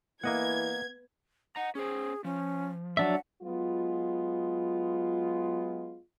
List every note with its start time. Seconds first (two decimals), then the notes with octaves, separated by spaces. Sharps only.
0.24 E3 A#3 B3 D#5 F#5 G#6
1.56 D#5 F#5 A#5
1.75 C#4 G#4 C5
2.24 F3 C#4
2.97 F#3 D4 E5 F#5
3.42 F#3 G#3 B3 F4